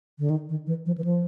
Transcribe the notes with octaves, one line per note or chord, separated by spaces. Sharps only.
D3
D#3
D#3
E3
F3
E3
F3